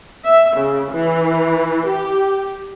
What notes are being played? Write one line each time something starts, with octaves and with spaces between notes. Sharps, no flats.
E5
C#3
E3
G4